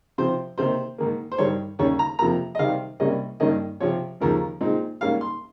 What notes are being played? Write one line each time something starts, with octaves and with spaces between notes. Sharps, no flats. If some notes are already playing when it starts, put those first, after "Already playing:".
C3 F3 C4 C5
C3 D#3 A#3 D#4 C5
G#2 D#3 A#3
C5
G2 D#3 G3 C#5
D#2 C#3 G3 C#4 C#5
A#5
F2 C3 F3 A#3 A#5
D#5
C3 D#3 G3 C4 F5
C2 C3 G3 A#3 C#4 D#5
G2 D#3 A#3 C#4 D#5
C3 F3 C4 C#5
D#2 C#3 F3 G#3 A#4
A#2 G#3 C4 D#4
G#2 G3 A#3 C#4 F5
C6